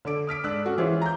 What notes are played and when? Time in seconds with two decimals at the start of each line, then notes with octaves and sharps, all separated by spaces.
0.05 D3 A4 D6 D7
0.27 D#6 F6 B6 D7
0.44 G#2 D4 E6 F#6
0.64 C#4 F#4 A4
0.78 E3 F4 G#4 C5 C#5
1.02 A#5 G6